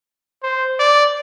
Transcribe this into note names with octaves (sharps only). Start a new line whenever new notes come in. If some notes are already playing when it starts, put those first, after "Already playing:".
C5
D5